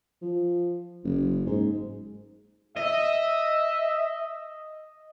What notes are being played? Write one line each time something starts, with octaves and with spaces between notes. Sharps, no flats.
F3
F#1
G#2
D#5 E5